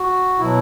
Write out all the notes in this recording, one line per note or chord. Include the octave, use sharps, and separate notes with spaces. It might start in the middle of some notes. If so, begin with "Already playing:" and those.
Already playing: F#4
B2 F#3 E4